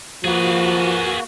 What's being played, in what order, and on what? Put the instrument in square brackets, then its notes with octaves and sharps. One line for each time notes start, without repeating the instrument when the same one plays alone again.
[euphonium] F3 [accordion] A#3 F#4 [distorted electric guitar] G#4 B4